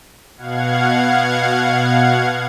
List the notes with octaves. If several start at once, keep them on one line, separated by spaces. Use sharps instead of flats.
B2 F5 F#5 G#6